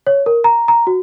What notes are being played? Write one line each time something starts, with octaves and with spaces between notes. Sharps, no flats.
C#5
A#4
A#5
A#5
F#4